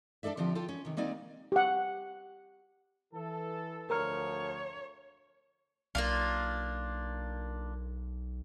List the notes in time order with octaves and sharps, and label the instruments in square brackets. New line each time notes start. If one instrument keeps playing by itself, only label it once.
[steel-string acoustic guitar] D4 E4 A4 D5 E5
D3 F3 C4 F4 G4 E5
F4 A4 G5 A5
C#4
C3 D#3
G3 A#3 C4 D#4 D5
[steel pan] G4 F#5
[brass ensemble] E3 A4
[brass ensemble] D2 F3 [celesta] A#4 A#5 F6 [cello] C#5
[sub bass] B1 [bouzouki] A#3 D4 F4